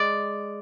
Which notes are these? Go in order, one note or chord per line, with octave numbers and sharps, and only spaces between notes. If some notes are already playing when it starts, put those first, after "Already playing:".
Already playing: G#3 D5